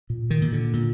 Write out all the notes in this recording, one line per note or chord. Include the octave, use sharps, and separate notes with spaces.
A#2
D#3
A#2
D3
A#2